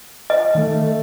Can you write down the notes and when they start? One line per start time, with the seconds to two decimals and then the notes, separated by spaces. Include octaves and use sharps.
0.30 D#5
0.55 D#3 A3